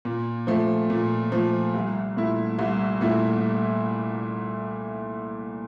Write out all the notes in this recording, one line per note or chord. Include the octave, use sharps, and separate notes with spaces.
A#2
F3 A3
A#2
F3 A3
C2
A#2 A3 E4
C2
A#2 A3 E4